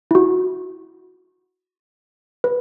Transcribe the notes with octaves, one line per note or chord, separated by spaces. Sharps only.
E4
F#4
B4